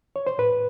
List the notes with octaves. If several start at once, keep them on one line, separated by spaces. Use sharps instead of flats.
C#5
C5
A2 B4